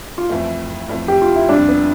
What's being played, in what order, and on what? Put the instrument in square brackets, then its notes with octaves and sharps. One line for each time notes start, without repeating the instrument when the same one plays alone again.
[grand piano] F4
[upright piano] F2 E3 A3 [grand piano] E4
[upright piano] F2 E3 A3
[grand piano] G4
F4
E4
[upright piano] F2 C3 G3 [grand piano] D4
[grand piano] B3